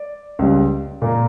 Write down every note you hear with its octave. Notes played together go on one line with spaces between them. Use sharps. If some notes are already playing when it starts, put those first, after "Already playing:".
Already playing: D5
C#2 C#3 G3
A#2 A#3